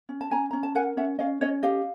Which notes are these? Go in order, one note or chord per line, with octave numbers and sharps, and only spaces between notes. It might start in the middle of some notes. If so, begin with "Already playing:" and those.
C#4
A5
C#4 G#5 A#5
C#4 A#5
A5
A#4 F#5 G#5
C#4 E5 F#5
C#4 D#5 F5
C#4 C#5 D#5
G4 D#5 F5